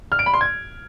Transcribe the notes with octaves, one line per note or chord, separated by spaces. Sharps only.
F6
D7
B5
C6
G#6